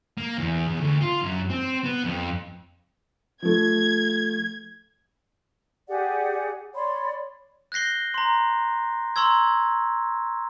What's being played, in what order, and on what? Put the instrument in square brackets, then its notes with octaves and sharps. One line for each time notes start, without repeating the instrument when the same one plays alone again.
[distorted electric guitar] A#3
E2
E2
D2
F4
F#2
C4
B3
F2
[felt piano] F3 A3 [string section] G#6
[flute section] G4 G#4 D5 F#5
C#5 D5 B5 C6
[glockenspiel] F#6 G6 A#6 C7 G7
A#5 C6
A#5 C6 C#6 E6 G#6